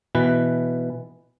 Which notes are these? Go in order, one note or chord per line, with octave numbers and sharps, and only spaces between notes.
B2 E3 B4